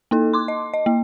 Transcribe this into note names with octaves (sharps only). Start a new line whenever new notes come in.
A#3 D#4 A4
C6 D6
D#5
D#5
A#3